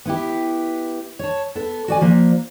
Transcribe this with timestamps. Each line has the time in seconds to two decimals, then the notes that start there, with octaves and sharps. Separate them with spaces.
0.06 B3 E4 G4
1.19 C#5 A5
1.55 B3 A4
1.88 F#4 D5 G#5
2.01 F3 A#3 D4